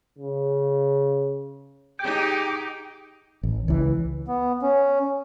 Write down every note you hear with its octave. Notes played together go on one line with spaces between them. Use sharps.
C#3
D#4 G4 G#4 G5 D6
A1
C#2 E3
B3
C#4